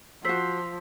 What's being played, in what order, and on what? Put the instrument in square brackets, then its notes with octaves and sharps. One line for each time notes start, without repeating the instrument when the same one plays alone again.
[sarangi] F3 [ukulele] F#4 C5 [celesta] E6 B6